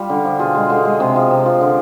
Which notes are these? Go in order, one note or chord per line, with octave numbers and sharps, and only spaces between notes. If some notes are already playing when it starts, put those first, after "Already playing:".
Already playing: G3 F4
D3
F3
B2 F4 G#4
G#3
D3
G#3
C3
F3
C3
F3
D3